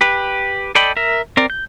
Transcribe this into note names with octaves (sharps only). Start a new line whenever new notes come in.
G4 B4
A4 D5 D#5 G5 B5
A#4 E5
C4 A#4 D5
G6